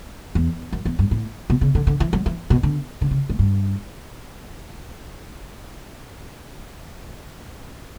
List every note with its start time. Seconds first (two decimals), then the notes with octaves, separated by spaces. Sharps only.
0.35 E2
0.72 F#2
0.85 E2
0.99 G2
1.11 A2
1.50 B2
1.61 C#3
1.75 D3
1.87 D3
2.00 E3
2.13 F#3
2.26 E3
2.50 B2
2.63 D3
3.01 D3
3.11 C#3
3.29 A2
3.39 G2